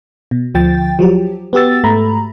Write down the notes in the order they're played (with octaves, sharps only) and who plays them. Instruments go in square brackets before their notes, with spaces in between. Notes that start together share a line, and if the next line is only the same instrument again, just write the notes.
[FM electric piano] B2
D2 F3 G5 A6
F3 F#3 G4
B3 F#4 G4 E6 A6
G#2 A3 A#5 B5